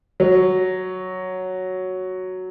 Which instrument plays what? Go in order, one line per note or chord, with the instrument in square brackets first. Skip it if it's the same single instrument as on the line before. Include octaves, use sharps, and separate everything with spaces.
[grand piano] F#3